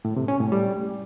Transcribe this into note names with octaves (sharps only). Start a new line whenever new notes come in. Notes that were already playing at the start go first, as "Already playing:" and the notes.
A2
C3
C#4
A2
G3